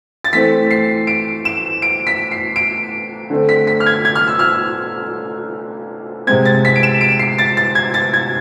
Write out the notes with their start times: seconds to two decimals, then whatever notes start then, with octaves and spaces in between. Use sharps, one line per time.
0.24 A6
0.33 E3 A3 C4 B6
0.71 C7
1.07 D7
1.45 E7
1.82 D7
2.07 B6
2.31 C7
2.56 D7
3.30 D3 A3 C4
3.49 B6
3.67 B6
3.80 F6
3.86 G#6
4.05 G#6
4.15 F6
4.28 E6
4.39 F6
6.27 C3 G#3 C4 G#6
6.45 A6
6.65 B6
6.76 D7
6.83 E7
7.01 D7
7.19 C7
7.38 A6
7.57 A6
7.75 G#6
7.94 A6
8.13 G#6